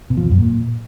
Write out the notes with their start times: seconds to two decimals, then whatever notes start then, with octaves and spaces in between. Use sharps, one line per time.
0.10 B2
0.17 F3
0.24 E2
0.31 F#2
0.38 A#2